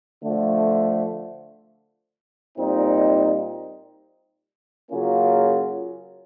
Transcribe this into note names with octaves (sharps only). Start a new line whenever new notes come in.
D3 F3 A3
A#2 G3 C4 D#4
C#3 F#3 A#3 C#4 F4